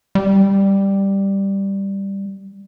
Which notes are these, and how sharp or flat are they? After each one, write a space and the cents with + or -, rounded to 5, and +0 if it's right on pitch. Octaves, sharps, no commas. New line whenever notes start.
G3 +5